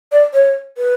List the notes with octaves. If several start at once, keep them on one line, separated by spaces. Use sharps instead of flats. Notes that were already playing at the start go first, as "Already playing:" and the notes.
D5
C#5
B4